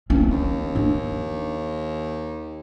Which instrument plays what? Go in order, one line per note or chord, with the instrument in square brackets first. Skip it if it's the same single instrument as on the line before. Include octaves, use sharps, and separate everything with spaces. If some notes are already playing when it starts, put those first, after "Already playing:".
[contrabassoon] D1 [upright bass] C4 C#4
[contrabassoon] D#2
[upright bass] D4